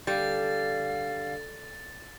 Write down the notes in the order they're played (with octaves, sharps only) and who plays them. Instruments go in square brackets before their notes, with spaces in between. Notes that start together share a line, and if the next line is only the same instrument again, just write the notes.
[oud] D3 [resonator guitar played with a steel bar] G3 [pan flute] F5 [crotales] A6